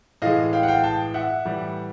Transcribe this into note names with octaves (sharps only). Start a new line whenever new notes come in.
A2 E3 G#3 D#5 F5
F5 G5
F#5
F5 G5
G5 A5
E5 F#5
A2 E3 G3